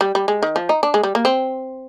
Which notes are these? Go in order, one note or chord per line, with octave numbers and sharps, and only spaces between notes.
G3
G3
G#3
D#3
F3
D#4
D4
G#3
G3
A#3
C4